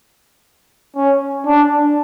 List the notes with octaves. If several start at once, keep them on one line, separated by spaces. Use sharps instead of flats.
C#4
D4